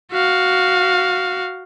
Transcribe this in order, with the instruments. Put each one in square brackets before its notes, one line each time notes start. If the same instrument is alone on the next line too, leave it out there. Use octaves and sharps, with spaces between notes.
[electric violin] F#4 F5